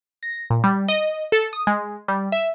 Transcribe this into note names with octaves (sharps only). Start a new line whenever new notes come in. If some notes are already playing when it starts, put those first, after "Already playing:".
A#6
A#2
G3
D#5
A4
D#6
G#3
G3
E5